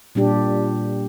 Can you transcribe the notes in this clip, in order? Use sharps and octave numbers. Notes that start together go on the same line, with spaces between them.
A#2 G3 D4 G4